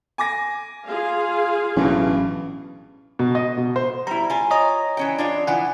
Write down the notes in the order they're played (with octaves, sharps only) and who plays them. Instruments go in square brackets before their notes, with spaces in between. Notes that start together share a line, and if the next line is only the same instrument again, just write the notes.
[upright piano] G#5 D6 A#6
[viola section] F4 G#4 F5
[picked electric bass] A1 F#3 C#4 [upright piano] G2 B2 E3
[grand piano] B2
D#5
B2
C5
[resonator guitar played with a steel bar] G3 E4 [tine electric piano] A#5
[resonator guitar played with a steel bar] F4 G#5
[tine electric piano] C#5 D#5 A#5
[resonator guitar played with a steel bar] E3 C#4 G5
D4 F4 G5
[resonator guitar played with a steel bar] E3 F3 [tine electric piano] F#5 G#5